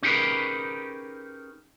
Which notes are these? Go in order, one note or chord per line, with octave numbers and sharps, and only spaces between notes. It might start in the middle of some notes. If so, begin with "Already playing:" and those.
C#4 D#4 G4 G#4 A#4 B4